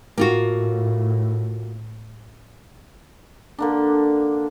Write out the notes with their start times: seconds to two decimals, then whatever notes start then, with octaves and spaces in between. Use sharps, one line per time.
0.18 A2 A#3 F4 F#4
3.59 D3 A#3 D4